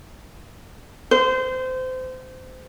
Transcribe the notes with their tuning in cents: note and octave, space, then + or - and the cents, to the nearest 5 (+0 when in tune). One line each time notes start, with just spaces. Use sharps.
C5 -25